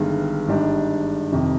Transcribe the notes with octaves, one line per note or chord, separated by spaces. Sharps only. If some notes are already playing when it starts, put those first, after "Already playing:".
Already playing: G1 G2 D#3 G#3
G#1 G#2 G3 D4 G4
F2 C3 D#3